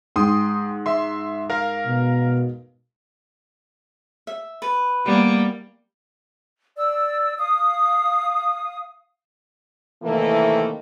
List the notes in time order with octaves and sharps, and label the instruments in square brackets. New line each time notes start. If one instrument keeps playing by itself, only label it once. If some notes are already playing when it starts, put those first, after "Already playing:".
[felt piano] G#2 [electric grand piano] G5 C6 D#6
[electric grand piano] E5 C6
A#4 F5
[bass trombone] B2
[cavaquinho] E5
B4
[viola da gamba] G3 A#3 B3
[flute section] D5 E6
F5 D#6
[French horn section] A2 C3 D#3 E3 A3 A#3